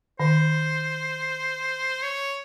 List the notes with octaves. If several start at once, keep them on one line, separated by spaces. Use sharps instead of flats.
D#3 C5
C#5